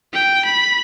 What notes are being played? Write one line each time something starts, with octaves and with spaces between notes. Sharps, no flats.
G5
B5